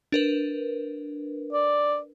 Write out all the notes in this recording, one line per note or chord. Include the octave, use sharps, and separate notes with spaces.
D4 A#4 B4
D5